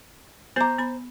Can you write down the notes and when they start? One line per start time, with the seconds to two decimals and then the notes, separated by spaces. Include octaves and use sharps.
0.56 B3 C5 A#5 D6
0.79 B3 B5